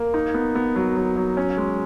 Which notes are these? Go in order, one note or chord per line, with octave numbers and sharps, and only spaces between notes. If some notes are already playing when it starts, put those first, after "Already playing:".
Already playing: A#3
D#4
B3
B3
F#3
F#3
F#3
C#4
G#3